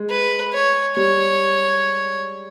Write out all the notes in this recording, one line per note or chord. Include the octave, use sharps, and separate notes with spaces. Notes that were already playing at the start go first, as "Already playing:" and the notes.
Already playing: G#3
B4
C#5
G3 C#5